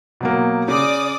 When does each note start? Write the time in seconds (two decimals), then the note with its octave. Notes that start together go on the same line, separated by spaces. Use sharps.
0.21 B2 F#3 A#3
0.68 C#3 D5 D6 D#6